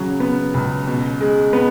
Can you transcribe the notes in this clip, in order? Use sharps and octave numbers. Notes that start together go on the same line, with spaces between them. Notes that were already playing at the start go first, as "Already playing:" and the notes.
Already playing: C#3 F#3
B3
C#2
B2
G#3
B3